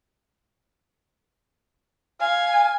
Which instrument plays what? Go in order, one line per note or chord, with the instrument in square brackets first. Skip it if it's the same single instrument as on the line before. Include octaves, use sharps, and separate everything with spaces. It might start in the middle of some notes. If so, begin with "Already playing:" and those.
[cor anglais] F5 [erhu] G#5